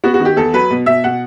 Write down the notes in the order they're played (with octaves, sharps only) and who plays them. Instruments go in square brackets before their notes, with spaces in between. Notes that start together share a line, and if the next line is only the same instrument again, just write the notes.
[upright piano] B3 F#4
F#4
D#3
G4
E2 A4
F#3 B4
B2
B2 E5
B2 F#5